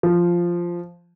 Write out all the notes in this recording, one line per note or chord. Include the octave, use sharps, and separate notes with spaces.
F3